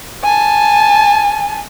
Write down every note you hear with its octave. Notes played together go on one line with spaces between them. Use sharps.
G#5 A5